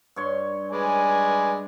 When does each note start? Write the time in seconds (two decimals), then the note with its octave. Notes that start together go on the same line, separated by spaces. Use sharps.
0.16 G2 C#5 C6
0.72 G#3 B4 D5 G#5